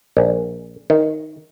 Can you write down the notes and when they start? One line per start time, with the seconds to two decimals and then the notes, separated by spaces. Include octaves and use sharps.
0.17 A#1
0.90 D#3